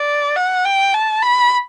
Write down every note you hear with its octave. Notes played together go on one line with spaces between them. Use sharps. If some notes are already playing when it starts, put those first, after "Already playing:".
Already playing: D5
F#5
G5
A5
B5